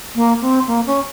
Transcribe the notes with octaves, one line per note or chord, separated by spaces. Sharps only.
A#3
C4
A#3
C#4